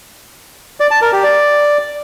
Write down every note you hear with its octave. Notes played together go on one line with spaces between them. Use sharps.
D5
A5
A#4
G4
D5